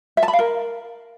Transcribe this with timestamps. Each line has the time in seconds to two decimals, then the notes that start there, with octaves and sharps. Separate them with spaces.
0.17 E5
0.23 A5
0.28 B5
0.33 F5
0.39 A#4